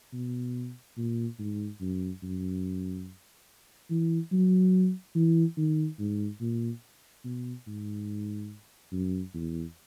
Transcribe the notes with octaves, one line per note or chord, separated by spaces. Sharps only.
B2
A#2
G#2
F#2
F#2
E3
F#3
E3
D#3
G#2
A#2
B2
G#2
F#2
E2